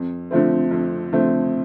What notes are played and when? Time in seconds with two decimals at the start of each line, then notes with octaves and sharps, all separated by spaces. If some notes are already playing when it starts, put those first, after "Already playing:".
Already playing: F2
0.31 D3 F3 A3 C4
0.71 F2
1.13 D3 F3 A3 C4